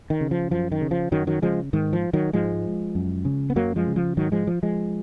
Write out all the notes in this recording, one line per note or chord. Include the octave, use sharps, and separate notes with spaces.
D#3
C#3
F3
F#2 F3
D#3
C#3
F3
F#2 D#3 F#3
D#3 F#3
C#3 F3 G#3
G#2 D#3
F3
D#3 F#3
G#2 F3 G#3
F#2
C#3
B3
F#2 F#3 A#3
F3 G#3
C#3
F3
G#2 D#3 F#3
F3 G#3
F3
F3 G#3